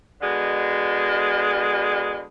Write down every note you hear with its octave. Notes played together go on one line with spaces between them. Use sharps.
B2 D3 G#3